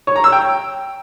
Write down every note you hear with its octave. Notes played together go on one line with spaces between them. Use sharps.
C#5
A#5
E6
G5